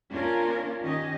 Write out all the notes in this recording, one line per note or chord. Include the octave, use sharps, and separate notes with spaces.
A#3 C#4 D4 F4 A#4
D#3 C#4 G4 D#5